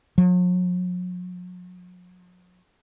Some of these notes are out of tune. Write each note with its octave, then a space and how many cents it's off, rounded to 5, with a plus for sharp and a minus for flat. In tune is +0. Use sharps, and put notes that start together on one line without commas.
F#3 -45